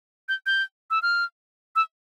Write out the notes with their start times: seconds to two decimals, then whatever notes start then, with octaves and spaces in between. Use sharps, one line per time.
0.29 G6
0.46 G6
0.91 E6
1.02 F6
1.76 E6